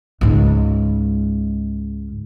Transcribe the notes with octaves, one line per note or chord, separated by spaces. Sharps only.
C#2 G#2